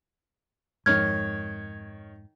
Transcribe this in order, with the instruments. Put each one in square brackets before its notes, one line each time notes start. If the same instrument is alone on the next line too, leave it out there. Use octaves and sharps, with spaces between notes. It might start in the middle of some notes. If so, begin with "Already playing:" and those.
[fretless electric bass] F2 G#2 [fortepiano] D#3 C#5 F6 [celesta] G#6